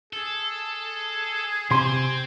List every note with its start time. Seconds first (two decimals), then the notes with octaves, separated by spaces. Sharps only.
0.13 G#4 A4
1.71 C3 C4 G#5 C6